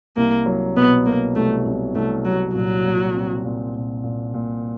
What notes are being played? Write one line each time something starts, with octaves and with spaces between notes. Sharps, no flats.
C2 A#3
F#3
B2 B3
B2 A#3
C2 A3
C2
C2 A3
C2 F#3
A#2 F#3
A#2
C4
A#2
A#2
A#2
A#2